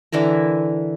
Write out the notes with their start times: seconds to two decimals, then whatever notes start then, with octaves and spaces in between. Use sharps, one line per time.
0.12 D3 E3 E4 A#4